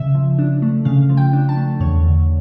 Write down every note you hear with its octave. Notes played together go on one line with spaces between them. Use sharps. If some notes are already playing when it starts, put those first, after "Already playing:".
Already playing: C#3 E5
F3
D4
A3
C#3 F5
F3
G5
D4
A5
A3
E2 C#5
D3